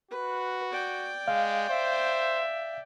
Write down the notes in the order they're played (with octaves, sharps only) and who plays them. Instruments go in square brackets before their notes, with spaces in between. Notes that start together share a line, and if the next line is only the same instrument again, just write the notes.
[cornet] F#4 [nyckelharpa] B4
[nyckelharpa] D5 G5
[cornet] G#3 [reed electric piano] F5
[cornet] C5 [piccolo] E5